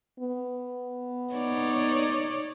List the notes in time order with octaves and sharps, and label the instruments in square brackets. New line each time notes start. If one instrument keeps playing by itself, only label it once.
[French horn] B3
[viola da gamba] D#4 C#5 D5